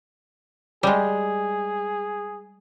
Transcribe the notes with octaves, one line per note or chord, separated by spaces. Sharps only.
G3 G#3 G#4